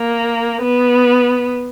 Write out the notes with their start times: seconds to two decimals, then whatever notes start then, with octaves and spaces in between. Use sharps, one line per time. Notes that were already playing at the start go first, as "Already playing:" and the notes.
Already playing: A#3
0.62 B3